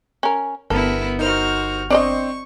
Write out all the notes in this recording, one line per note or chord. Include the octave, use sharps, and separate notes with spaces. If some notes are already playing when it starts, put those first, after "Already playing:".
C#4 A#4
G1 B3 E4 A4 A#4
D#4 F#4 A#4 C5 F6
C4 D4 C5 D5 D#5 C#6